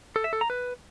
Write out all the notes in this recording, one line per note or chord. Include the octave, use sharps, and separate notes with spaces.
A4
E5
A4
A#5
B4